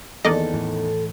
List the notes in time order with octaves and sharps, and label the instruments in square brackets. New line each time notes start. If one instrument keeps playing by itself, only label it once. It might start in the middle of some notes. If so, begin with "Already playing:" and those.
[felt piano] E2 D#3 [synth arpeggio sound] A#3 D5 D#5 [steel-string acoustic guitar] A4
[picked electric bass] A2 E3